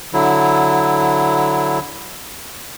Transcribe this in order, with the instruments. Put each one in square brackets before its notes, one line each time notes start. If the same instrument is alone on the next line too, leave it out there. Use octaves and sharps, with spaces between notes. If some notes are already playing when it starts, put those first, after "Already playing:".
[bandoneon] D3 F#3 E4